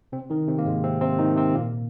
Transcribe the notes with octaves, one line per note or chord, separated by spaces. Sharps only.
C3 C4
D#3 D#4
C3 C4
A#3
G#2 G#3
C3 C4
C3 C4
D#3 D#4
C3 C4
A#2 A#3